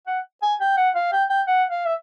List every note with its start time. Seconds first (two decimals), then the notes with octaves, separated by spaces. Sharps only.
0.07 F#5
0.43 G#5
0.61 G5
0.77 F#5
0.95 F5
1.12 G5
1.30 G5
1.47 F#5
1.70 F5
1.86 E5